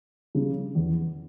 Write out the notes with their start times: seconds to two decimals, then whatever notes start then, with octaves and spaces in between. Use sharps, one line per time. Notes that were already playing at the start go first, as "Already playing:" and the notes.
0.35 C#3 G3
0.75 E2